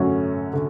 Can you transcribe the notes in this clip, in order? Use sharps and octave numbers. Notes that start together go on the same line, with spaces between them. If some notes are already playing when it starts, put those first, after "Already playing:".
Already playing: F#2 D3 A3 C#4 F#4
D3